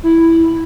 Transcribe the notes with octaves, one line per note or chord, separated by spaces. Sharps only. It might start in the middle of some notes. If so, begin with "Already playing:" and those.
E4